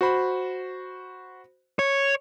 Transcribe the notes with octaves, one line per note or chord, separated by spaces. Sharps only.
F#4 C5 B5
C#5